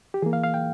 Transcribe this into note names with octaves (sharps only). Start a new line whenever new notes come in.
G4
E3 A#3 G#4
F5
F5
G5